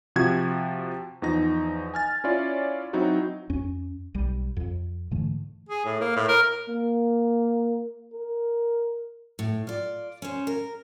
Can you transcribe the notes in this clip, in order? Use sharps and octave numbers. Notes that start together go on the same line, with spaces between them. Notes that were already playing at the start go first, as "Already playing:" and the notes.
C3 F3 F#4 G#6
E2 F3 D#4 A#6
G#5 F6 A6
C#4 E4 F4 C#5 D5
F#3 C4 D#4 E4 F#4
F2 C#4
B1 G3
F2
G#2 D3 E3 A3
G#4
A2
A#3
A2
A#4
A#3
A#4
A2
F4 D5
C#4 C5
A#4